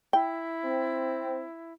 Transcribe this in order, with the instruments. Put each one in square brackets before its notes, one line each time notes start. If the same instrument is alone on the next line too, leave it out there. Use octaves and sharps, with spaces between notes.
[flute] E4 [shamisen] G5
[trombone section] C4